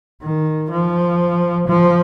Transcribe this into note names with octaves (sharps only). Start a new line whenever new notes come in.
D#3
F3
F3